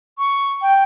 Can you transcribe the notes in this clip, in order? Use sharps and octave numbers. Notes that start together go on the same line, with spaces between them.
C#6
G5